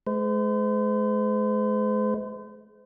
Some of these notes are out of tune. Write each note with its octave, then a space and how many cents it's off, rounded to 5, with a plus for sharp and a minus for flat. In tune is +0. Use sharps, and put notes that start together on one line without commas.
G#3 +35 C5 -40